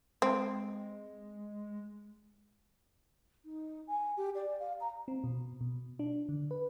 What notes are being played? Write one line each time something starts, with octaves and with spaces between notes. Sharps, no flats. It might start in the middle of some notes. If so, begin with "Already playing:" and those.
G#3 C4
D#4
G#5
G4
D5
F5
A#5
C4
B2
B2
D4
D3
B4